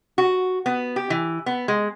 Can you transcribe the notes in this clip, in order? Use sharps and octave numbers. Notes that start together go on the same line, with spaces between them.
F#4
B3
G4
E3
B3
G#3